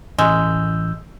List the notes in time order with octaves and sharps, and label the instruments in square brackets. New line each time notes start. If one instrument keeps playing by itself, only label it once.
[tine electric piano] A1 E6 G6 [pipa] G#3